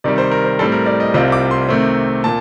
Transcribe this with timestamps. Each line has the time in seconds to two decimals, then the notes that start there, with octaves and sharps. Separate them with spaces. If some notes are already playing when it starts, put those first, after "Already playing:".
0.04 C3 D#3 G3 D5
0.18 C5
0.31 A#4
0.45 C5
0.59 A2 G3 C4 A4
0.72 A#4
0.86 D5
1.00 D#5
1.14 C2 C3 G3 C4 F4 D#5
1.32 D6
1.51 C6
1.69 C3 D#3 A3 C4
2.24 A#2 A5